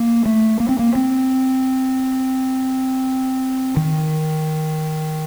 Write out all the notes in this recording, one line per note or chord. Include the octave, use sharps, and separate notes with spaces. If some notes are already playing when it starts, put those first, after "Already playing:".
Already playing: A#3
A3
A#3
C4
A#3
C4
D#3